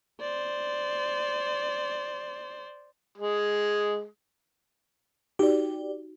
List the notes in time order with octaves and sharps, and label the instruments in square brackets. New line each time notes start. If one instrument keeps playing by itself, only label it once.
[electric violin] C5 D5
[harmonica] G#3
[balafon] D#4 F#4 [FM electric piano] G4 D5